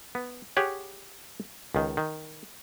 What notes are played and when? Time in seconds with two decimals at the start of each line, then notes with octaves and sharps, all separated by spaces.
0.15 B3
0.57 G4 G#4 C#5 F#5
1.75 C#2 D#3
1.97 D#3